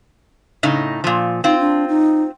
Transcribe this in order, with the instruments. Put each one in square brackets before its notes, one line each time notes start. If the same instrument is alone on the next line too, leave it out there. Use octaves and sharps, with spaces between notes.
[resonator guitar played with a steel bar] A2 C#3 D#4
A#2 F3
[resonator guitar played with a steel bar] C4 F4 [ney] D#4
[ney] D4
D#4